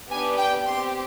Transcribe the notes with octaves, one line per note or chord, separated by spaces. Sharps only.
B3 D4 G4 G#5
G5
C4 G4 C6